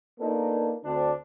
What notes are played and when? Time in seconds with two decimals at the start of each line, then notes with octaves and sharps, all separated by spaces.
0.19 A#3 B3 D4 D#4 F4 A4
0.84 D2 C4 D4